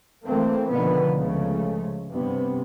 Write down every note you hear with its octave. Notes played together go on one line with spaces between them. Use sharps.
E3 A3 A#3 C4
B2 D3 D#3 F3 A3 B3
C#2 C#3 F3 A3
G2 C3 B3